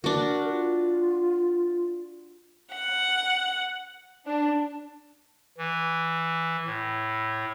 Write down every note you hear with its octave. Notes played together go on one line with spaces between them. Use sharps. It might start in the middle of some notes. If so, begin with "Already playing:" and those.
D4 F#4 A#4
F4
F#5
D4
E3
A2